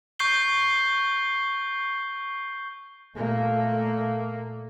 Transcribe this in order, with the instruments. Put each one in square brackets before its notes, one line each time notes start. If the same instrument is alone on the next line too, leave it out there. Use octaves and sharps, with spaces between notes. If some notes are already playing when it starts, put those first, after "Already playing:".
[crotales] C#6 G6 C7 G7
[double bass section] A#2 A3 A#3